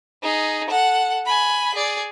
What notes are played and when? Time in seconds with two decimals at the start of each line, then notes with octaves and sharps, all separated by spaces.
0.23 D#4 G#4
0.69 A4 F#5
1.26 G#5 B5
1.74 G#4 D5